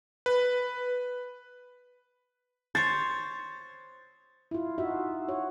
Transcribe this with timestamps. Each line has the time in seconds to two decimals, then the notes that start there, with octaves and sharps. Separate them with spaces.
0.26 B4
2.75 C5 C#5 A6
4.51 E4 F4
4.78 D#4 F4 F#4 E5
5.28 F#4 C#5